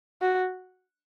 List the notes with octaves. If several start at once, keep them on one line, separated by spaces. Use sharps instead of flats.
F#4